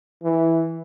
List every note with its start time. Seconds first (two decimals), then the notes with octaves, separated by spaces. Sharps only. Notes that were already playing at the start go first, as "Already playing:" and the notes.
0.23 E3